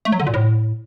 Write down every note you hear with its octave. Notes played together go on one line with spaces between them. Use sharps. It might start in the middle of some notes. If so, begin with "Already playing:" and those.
A3
F#3
D3
A#2
A2